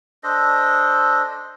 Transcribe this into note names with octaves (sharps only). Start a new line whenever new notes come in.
D4 A4 C5 D#5